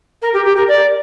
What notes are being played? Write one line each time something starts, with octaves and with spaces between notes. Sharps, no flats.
A#4
G4
G4
A#4
D5